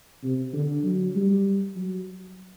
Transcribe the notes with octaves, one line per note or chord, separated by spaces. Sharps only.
C3
D3
F#3
G3
F#3